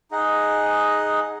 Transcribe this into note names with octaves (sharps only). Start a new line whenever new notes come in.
D#4 G#4 D#5 F#5